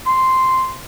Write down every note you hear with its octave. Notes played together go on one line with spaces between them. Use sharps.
C6